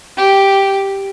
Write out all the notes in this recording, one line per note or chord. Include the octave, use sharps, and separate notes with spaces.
G4